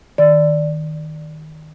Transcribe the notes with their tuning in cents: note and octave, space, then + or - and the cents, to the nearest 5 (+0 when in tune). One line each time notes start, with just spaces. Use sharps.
D#3 +0 D5 +0